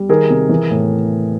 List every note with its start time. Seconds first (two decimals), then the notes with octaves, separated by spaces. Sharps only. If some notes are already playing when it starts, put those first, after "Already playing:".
Already playing: G3
0.09 D#3 G#4 A#4
0.30 C3
0.49 E3
0.71 A2